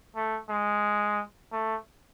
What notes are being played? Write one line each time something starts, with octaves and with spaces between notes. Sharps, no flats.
A3
G#3
A3